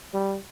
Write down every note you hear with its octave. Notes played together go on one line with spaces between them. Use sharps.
G3